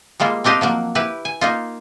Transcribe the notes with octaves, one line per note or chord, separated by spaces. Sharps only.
G3 G#3 A#3 F4
C4 D4 G4 D#5 F5
F3 F#3 A#3
E4 G4 B4
G#5
A#3 D#4 F4